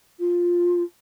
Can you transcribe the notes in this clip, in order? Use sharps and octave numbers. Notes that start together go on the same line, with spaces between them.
F4